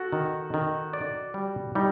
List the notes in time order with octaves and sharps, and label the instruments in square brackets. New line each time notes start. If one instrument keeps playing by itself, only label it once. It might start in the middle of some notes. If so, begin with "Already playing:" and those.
Already playing: [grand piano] F#4 A4
[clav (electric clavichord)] D#3
D#3
D5
G3
[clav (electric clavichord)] G3 [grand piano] D#4